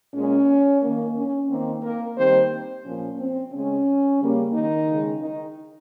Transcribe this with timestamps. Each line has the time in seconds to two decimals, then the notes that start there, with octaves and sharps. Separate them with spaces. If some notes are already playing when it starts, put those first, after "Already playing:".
0.14 A#2 G#3 C#4
0.82 D#3 A#3
1.16 C#4
1.49 D#3 A#3 C4
1.83 A#3 A#4
2.17 D#3 G3 A#3 C4 C5
2.84 A#2 F3 A#3 C#4
3.18 C4
3.53 C#3 G#3 C#4
4.20 C#3 G3 A#3
4.54 D#3 D#4
4.88 C#3 G#3
5.21 D#3 D#4